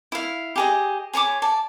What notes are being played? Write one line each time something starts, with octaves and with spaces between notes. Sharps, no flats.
E4 F5
G4 G#4 D#5
G#4 C#5 B5 D6
D5 A5